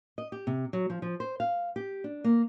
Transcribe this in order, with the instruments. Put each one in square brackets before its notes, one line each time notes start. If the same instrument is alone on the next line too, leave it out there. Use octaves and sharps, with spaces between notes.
[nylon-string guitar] D#5
G4
C3
F#3
F3
F3
C5
F5
G4
D4
A#3